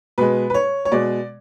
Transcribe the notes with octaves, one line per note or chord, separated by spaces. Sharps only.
B2 G#3 B4
B4
C#5
C#5
B2 G#3 D5